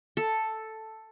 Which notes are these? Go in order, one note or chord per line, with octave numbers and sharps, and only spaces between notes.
A4